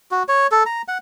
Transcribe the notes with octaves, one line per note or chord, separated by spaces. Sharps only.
F#4
C#5
A4
A#5
F#5